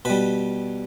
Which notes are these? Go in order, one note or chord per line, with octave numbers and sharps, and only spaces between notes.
B2 G3 B4